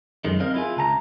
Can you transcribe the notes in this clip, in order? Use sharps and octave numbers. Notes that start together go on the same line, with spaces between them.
F#2 D#3 G#3
C4 A#4 D#5 F5
E4 F4 G#4
C#2 A5 A#5